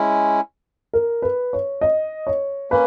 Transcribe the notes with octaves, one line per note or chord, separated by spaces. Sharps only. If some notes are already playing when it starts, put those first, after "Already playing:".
Already playing: G#3 C#4 E4
A#4
B4
C#5
D#5
C#5
A#3 C#4 B4